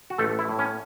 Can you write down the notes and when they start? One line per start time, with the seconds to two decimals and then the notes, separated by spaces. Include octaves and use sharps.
0.10 F#4
0.18 A1 A3 A4
0.39 E4
0.49 A2
0.59 C#4